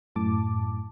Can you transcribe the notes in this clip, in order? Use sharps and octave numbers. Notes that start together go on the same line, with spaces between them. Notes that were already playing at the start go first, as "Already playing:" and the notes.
F#2 A2 A5 D6